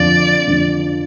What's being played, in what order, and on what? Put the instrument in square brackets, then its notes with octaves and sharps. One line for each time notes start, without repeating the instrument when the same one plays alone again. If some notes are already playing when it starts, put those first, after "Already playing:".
Already playing: [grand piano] F2 D3 F3 [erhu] D5
[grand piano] F2 D3 F3